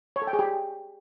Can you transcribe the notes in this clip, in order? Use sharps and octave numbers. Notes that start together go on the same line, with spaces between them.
C#5
A4
G5
G#4
G4